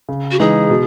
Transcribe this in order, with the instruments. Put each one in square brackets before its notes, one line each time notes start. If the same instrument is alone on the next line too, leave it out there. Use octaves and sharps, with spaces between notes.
[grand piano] C#3
[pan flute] F#4
[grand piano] E3 G#3 D#4 [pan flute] G#4
[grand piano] B2